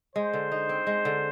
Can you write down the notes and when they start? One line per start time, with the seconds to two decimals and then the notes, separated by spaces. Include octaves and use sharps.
0.15 G#3 C5
0.34 D3
0.52 D#4
0.69 C4
0.87 G#3
1.05 D3